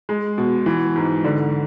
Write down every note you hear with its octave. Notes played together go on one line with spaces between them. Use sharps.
G#3
B2
E3
G#2
D3